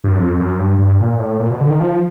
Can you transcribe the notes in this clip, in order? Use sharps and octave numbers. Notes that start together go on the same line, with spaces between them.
G2
F#2
F2
F#2
G2
G2
A#2
A2
A#2
B2
D3
D#3
F3